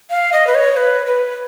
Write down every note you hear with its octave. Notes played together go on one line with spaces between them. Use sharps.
F5
D#5
B4
C#5
B4
B4